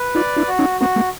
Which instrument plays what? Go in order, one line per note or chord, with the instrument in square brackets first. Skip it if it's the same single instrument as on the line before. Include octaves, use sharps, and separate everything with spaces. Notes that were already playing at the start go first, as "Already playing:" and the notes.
Already playing: [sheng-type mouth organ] B4
[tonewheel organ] D#4 F4 [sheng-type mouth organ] D5
[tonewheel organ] D4 E4
[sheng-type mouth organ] F#4
[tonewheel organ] C#4 D#4
[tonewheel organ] A#3 C4 [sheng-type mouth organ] F#4
[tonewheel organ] G#3 A#3